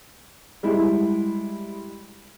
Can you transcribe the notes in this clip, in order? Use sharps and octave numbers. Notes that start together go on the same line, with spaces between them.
G3 G#3 E4